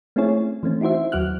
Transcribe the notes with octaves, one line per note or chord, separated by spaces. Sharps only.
A3 C4 C#4 E4 G#4 C#5
E3 A3 C4 C#4
D#4 E4 F#4 C5 E5
D#2 F#3 F#4 F6 F#6